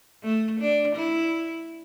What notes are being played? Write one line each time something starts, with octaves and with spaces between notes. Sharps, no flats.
A3
D4
E4